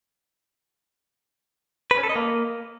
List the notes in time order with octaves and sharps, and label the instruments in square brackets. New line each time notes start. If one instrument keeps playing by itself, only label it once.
[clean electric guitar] B4
C#4
A4
D#5
A#3